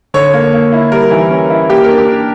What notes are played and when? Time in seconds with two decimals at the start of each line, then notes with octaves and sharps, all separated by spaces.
0.14 D3 C#5
0.34 A#3
0.53 A#3
0.72 E4
0.92 G3 A#4
1.11 E3
1.30 C#4
1.50 E4
1.69 A#3 G4
1.84 D4 A#4
1.98 G4
2.08 D4